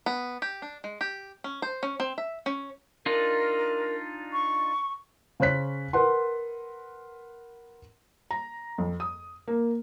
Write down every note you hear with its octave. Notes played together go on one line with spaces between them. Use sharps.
B3
G4
D4
G#3
G4
C#4
C5
C#4
C4
E5
C#4
D4 D#4 F4 A#4
C#6
C#3 C5 C#5 F#6 B6
A#4 B4 F#5 C6
A#5
F2
D#6
A#3